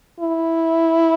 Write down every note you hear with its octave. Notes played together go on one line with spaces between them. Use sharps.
E4